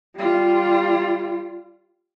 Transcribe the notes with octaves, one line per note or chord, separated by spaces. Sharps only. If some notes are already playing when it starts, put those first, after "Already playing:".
G3 F4